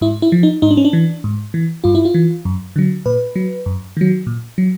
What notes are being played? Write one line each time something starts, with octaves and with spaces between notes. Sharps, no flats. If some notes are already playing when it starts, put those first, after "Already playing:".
G#2 E4
E4
F3
D#4
G#2 D#4
D4
C#4
D4
E3
G#2
E3
G2 F4
E4
F4
E3
F#2
D3 F#3
A#2 B4
F#3
F#2
D#3 F#3
A#2
F#3